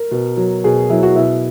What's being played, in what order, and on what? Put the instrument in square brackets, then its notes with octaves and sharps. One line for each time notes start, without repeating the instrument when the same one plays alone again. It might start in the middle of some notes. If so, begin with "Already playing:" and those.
Already playing: [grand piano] A#4
B2
F#3
B2 G#4
F#3 E4
F#4
B2 E4